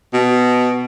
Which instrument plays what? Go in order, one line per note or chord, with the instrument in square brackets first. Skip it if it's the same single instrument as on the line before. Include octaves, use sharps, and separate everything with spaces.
[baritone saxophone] B2